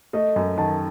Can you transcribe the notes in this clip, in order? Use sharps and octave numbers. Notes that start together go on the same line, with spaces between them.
A3 D#5
F#2
D#3 A5